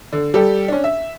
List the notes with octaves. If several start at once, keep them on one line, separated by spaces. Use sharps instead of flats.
D3
G3 G4 A4
C#4 D4
E5